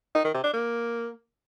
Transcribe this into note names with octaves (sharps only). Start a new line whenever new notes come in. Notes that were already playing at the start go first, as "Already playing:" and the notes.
D#4
D#3
C3
D4
A#3